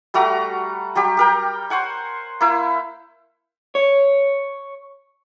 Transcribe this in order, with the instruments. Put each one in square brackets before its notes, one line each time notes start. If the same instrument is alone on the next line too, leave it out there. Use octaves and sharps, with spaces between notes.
[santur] G3 A3 F#4 A#5
F#3 G3 G4
G4 A#4 G5
C5 C#5 F#5 G#5
A#3 E4
[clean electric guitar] C#5